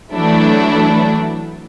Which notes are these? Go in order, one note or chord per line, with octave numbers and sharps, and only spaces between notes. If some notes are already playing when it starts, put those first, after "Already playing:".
E3 F#3 A3 D4 E4